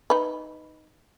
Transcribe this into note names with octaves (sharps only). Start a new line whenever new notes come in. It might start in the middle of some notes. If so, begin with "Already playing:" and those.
D#4 B4